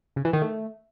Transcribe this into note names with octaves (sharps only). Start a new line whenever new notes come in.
C#3
E3
D#3
A3